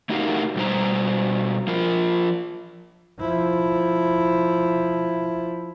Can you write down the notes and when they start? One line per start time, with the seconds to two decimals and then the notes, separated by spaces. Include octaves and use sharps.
0.09 A3 D#4 F#4 G4 A#4 F5
0.56 B2 G3 F#4 C5 A#5
1.67 F3 F4 A#4
3.20 F3 E4